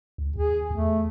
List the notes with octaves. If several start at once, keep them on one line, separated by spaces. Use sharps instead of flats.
C#2
D#2 G#4
E2 A3